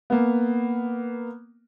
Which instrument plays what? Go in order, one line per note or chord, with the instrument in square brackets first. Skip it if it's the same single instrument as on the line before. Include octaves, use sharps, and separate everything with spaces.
[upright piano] A#3 B3